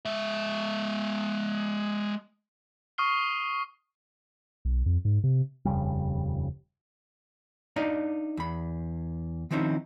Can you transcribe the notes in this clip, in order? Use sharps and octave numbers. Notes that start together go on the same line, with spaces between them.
G#3 E5
C#6 D#6 F6 C7 G7
B1
F2
G#2
C3
D#1 F2 C#3 G3
D4 D#4 D5 D#5 F5 A#5
E2 B5
D#3 F3 C4 C#4 D#4 E4